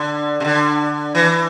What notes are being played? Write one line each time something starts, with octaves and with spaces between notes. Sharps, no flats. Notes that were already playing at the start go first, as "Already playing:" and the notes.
Already playing: D3
C3
D3
E3